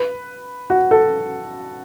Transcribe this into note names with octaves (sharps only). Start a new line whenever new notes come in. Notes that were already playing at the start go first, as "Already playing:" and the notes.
Already playing: B4
F#4
A4